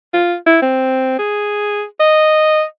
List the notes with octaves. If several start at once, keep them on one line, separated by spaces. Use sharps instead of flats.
F4
E4
C4
G#4
D#5